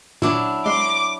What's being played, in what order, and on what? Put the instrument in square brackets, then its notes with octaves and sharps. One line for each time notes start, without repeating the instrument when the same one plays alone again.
[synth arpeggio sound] A#2 [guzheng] F#3 D4 E4
[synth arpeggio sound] G#3 [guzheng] C6 [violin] D6